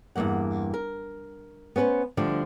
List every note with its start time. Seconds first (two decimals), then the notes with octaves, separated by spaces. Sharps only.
0.16 E2 G2 G#3 A#3 F#5
0.74 A#4
1.76 B3 C#4 A4 B4 C5
2.17 D2 D3 F3 G3 D4